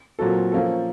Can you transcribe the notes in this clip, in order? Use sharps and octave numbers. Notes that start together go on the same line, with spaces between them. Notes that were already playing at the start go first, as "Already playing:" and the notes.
A#2 F#3 C4 F#4 A4
F3 A#3 C#4 A4